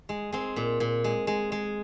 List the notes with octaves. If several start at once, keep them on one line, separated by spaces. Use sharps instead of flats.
G#3
G#3 C4
A#2
A#2
G#3
G#3
G#3